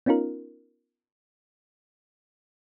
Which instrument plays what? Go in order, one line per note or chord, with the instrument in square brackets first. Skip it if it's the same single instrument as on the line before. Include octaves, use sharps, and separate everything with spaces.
[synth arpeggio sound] B3 C#4 D#4 F4 A#4